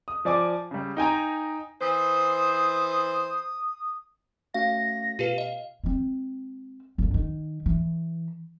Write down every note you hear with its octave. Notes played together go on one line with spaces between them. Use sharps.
D#6
F3 D5 G#5 D6
C#3 G3
D#4 G5 G#5 A#5
E3 C5 D#6
A3 C#4 F#4 F5 A#6
B2 F4 G4 B4 F5
D#5
G#3 C4
G1 C#2
D#3
E3